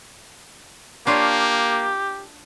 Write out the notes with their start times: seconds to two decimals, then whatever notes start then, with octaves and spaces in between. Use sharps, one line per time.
1.07 A#3 D4 F4 G4 C#5